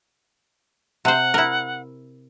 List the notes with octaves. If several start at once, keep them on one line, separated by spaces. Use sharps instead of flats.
C3 C5 F#5
E4 A#4